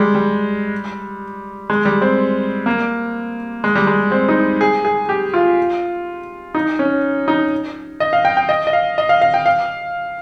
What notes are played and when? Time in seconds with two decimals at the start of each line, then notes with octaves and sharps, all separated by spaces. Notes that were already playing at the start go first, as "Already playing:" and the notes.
Already playing: G3 G#3
0.15 G3
1.70 G#3
1.85 G3
2.02 C4
2.66 A#3
3.64 G#3
3.75 G3
3.87 G#3
4.11 C4
4.29 D#4
4.61 G#4
4.85 G#4
5.09 G4
5.34 F4
6.55 D#4
6.79 C#4
7.28 D#4
8.00 D#5
8.13 F5
8.25 G5
8.37 G5
8.49 D#5
8.67 D#5
8.73 F5
8.98 D#5
9.09 F5
9.22 F5
9.34 G5
9.46 F5